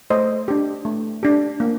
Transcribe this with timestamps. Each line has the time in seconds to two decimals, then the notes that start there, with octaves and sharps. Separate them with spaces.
0.10 A3 C5 D#5
0.48 D4 G4
0.85 A3
1.23 D4 G4
1.60 A#3